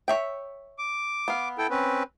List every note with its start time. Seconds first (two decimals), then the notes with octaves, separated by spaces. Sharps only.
0.08 C#5 E5 G5
0.79 D6
1.28 B3 F5
1.58 E4 A4 G5
1.70 C4 C#4 B4